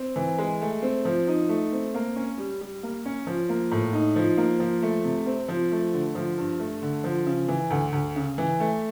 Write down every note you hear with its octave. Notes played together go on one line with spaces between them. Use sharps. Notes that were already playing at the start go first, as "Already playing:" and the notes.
Already playing: C4
E3
G#3
A3
C4
F3
D#4
A3
C4
A#3
C#4
G3
G3
A#3
C#4
F3
A#3
A2
D#4
F3
A#3
F3
A3
C3
C4
F3
A3
D3
F3
G2
A3
D3
F3
C#3
E3
D2
D2
C#3
E3
A3